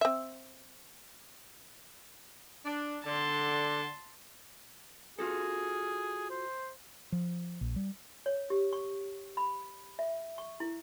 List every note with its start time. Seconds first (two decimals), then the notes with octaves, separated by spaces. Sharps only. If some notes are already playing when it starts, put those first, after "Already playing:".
0.01 C4 E5
2.65 D4
3.05 D3 A5 C6
5.19 F4 F#4 G#4 A4
6.30 C5
7.12 F3
7.61 A#1
7.76 G3
8.26 C#5
8.50 G4
8.73 C#6
9.37 B5
9.99 E5
10.38 C#6
10.60 E4